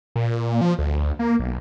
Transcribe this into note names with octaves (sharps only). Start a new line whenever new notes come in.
A#2
F3
D2
A#3
B1